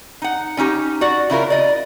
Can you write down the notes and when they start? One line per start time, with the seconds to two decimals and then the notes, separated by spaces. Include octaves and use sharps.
0.22 D#4 F#5
0.57 D3 C#4 D#4 G4
1.01 F#4 D5 F#5
1.30 C#3 E4 F4 A#4
1.50 D5 D#5